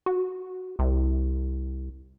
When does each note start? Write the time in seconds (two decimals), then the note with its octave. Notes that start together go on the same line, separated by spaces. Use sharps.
0.06 F#4
0.79 C2